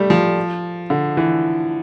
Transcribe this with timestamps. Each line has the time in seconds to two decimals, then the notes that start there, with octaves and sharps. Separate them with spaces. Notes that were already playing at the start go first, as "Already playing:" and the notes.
Already playing: G3 A3
0.10 F3
0.90 D3
1.17 E3